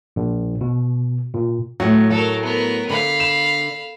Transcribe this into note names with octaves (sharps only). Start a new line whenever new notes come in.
A#1
B2
A#2
A2 F#3 F#4
F#3 A4 A#4
B3 A#4
D3 F5 B5
E7